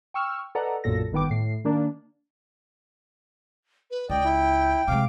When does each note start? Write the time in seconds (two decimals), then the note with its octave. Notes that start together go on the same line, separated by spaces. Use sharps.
0.14 G5 C#6 E6 F6
0.55 A4 B4 D5 D#5 F#5 A#5
0.84 B1 F#2 A#2 A4 A#6
1.12 G1 D#3 B3 G5 D6
1.30 A2 C7
1.65 D#3 A#3 D4
3.91 B4
4.10 C#2 D5 D#5 G5
4.24 E4
4.88 C3 G#3 F5 D6